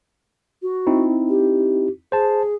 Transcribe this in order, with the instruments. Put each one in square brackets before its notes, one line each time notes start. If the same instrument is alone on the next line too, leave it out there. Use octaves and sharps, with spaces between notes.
[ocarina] F#4
[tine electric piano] C4 D#4 E4
[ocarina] G4
[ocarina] G#4 [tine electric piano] C5 A5